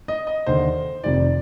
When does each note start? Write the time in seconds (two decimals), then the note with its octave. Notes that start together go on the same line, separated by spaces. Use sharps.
0.08 D#5
0.27 D#5
0.46 D#2 D3 C5
1.03 F1 F2 C3 D#3 D5